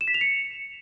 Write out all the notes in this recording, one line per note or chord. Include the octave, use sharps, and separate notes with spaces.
E7
B6
F7
C#7